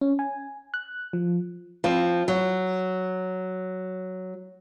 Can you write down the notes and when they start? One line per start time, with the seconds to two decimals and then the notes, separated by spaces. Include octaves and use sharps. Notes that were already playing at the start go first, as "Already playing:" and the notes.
0.01 C#4
0.19 G#5
0.74 F#6
1.13 F3
1.84 F3 C4
2.28 F#3